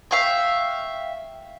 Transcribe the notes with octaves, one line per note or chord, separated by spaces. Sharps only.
E5 F5 G5 C#6